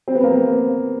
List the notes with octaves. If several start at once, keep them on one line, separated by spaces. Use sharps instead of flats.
C4
B3
A#3
B3